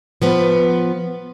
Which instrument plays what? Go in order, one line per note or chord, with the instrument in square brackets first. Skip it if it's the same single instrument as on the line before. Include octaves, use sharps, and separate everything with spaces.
[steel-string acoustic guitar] F3 B3 B4